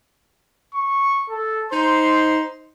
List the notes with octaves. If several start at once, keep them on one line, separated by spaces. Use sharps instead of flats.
C#6
A4
D#4 C5 C6